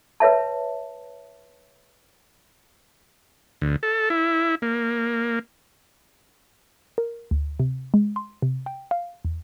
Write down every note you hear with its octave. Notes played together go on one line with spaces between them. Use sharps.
B4 C#5 E5 A5
D2
A4
E4
A#3
A#4
D2
C3
G#3
C6
C3
G5
F5
E2